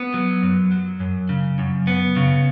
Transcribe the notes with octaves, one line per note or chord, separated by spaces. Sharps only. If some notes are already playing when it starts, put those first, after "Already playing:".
Already playing: B3
F#3
F#2
F#3
F#2
C#3
F#2
B3
C#3